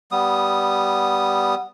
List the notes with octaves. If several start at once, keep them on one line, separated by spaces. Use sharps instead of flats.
G3 B3 D#6